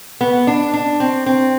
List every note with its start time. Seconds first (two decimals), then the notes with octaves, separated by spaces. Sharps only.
0.21 B3
0.47 D4
0.74 D4
1.00 C4
1.26 C4